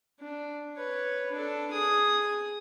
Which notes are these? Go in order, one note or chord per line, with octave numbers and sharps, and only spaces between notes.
D4
B4 C#5
D4 A4
G#4 D#6